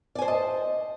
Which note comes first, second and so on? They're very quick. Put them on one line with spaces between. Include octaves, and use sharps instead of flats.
D5 G#5 C5 A5 D#5